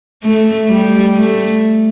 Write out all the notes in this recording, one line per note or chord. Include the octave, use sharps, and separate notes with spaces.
A3
G3
A3